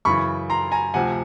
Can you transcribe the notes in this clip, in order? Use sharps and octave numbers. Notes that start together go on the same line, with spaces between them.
F#2 C#3 E3 B5 C#6
A#5 C6
G#5 A#5
D2 C3 F3 F#5 G#5